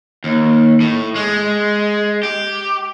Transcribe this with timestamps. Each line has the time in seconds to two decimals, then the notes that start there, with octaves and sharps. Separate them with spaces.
0.24 D#2
0.80 A2
1.16 G#3
2.23 G4